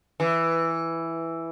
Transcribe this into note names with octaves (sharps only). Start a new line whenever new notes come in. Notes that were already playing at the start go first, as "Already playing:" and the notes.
E3